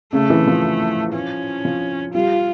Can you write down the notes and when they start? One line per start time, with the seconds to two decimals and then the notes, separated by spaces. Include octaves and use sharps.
0.13 C#3 A3
0.30 E3
0.47 F3
1.14 C#4
1.65 F3
2.14 G3 F4